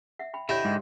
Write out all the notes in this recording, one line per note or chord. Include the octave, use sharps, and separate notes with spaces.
E5 F#5
G5 B5
D3 E4 G4 C#5 D#5 G5
G#2